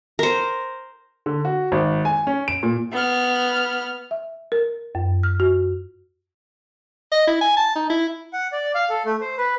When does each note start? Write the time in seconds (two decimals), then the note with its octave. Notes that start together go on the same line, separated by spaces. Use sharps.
0.19 A#4 C5
1.26 D3
1.45 F#4
1.72 G#1
2.05 G#5
2.27 C#4
2.48 D7
2.63 A#2
2.93 B3 F6
4.11 E5
4.52 A#4
4.95 F#2
5.23 F6
5.40 F#4
7.12 D#5
7.28 E4
7.41 G#5
7.57 A5
7.76 D#4
7.90 E4
8.33 F#5
8.52 D5
8.75 F5
8.90 A4
9.05 A3
9.21 C5
9.38 B4